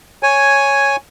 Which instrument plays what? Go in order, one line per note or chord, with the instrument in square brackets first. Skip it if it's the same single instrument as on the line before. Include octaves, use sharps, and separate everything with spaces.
[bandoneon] C#5 G#5